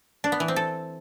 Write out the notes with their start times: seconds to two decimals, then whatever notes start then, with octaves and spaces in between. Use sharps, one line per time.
0.24 D4
0.32 B3
0.40 E3
0.48 C4
0.56 A4